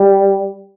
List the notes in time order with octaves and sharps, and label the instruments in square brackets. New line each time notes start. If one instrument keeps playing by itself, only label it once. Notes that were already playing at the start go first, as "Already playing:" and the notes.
Already playing: [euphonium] G3